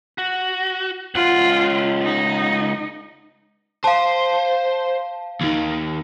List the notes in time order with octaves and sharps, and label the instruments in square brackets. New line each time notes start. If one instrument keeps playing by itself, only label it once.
[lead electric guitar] F#4
[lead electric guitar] C#2 F#5 [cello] F4
[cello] D#4
[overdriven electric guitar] C5 [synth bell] F5 A5
[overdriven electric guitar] D#2 D#3